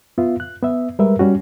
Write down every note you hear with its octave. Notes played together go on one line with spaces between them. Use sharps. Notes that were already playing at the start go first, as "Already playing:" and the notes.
B3 F4 E5
F#6
B3 E5
G3 G#3 A#4 B4 E5
G3 C#4 F#4